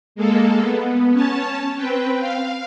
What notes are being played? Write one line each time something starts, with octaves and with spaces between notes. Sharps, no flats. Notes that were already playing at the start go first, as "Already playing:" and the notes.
G#3 A#3 A4
B3
C#4 C#5 A5
C4 B4 G5
F5